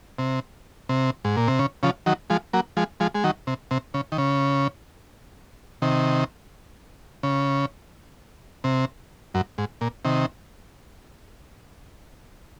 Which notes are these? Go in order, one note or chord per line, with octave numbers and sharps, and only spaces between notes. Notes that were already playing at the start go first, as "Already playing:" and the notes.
C3
C3
G#2
A#2
C3
C#3
C#3 F3
D#3 F#3
F3 G#3
F#3 A#3
F3 G#3
F3 G#3
G#3
D#3 F#3
C3
C3
C#3
D#3
C#3
C3 D#3
C#3
C3
F#2
G#2
A#2
C3 D#3